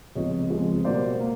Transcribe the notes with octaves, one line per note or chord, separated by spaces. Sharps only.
C#2 C3 F3 G#3 B3 C#5 D#5
C#2 C3 F3 G#3 B3
B2 G3 A#3 C5 D5
A#3